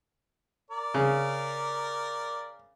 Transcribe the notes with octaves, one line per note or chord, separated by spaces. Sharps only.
A#4 D5
C#3